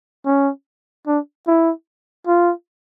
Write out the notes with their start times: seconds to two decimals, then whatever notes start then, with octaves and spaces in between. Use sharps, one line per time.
0.26 C#4
1.07 D4
1.47 E4
2.27 F4